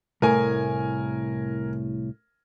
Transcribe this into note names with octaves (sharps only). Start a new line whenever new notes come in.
C2 A2 A#4 G#5